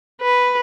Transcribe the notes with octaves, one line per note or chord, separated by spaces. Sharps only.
B4